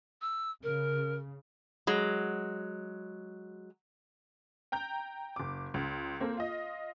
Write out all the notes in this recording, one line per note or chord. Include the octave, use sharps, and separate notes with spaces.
E6
C#3 A#4
F#3 G#3
G5 A#5 G6
F#1 D6
C#2
A#3 C4 A4
F4 D#5